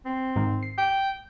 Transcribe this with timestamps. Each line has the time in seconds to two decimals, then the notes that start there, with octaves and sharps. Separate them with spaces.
0.05 C4
0.36 G#2 D#3
0.63 C7
0.78 G5